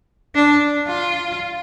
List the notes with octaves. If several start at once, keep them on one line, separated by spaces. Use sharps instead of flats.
D4
F4